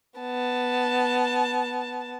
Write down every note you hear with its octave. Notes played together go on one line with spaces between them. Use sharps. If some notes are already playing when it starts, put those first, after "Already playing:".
B3 A5